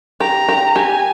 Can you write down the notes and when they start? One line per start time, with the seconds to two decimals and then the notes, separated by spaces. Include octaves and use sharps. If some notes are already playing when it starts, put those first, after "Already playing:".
0.20 G4 A#5
0.49 G4
0.76 G4 G#5